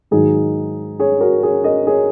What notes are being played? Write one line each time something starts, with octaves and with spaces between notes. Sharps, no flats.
G#2 D#3 F#3 D#4 G#4
G#4 C#5
F#4 A#4
G#4 C#5
A#4 D#5
G#4 C#5